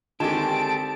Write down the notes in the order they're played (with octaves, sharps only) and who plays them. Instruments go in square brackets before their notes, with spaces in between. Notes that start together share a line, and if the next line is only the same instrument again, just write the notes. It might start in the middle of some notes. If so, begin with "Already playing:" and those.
[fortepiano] D3 D#3 [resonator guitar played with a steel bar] G#3 G4 [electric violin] C4 D7 [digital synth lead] A5